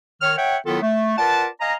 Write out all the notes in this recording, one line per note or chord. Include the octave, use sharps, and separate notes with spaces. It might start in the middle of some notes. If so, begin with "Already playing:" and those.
D#3 C#5 F6
C#5 E5 F#5 G5
D#3 F#3 B3 E4 F4 A4
A3
F4 A#4 B4 D5 F#5 A5
D#5 F5 G#5 A#5